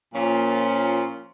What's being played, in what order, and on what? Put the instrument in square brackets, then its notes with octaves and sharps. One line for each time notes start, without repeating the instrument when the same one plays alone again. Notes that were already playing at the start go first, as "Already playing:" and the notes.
[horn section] A#2 F3 A#3 C#4 F4